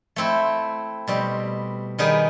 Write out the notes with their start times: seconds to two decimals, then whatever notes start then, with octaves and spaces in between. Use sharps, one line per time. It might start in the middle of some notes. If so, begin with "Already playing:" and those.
0.16 A3 C4 E4
1.08 B2 G3 C4
1.99 D#3 G3 B3 D#4 G#4